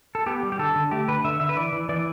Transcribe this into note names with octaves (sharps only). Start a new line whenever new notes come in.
A4
B3 G4
G3
G4
D3 A4
D3
A3 G4
D3 B4
D3 E5
D3 E5
B4
E3 D5
E3
E3 D5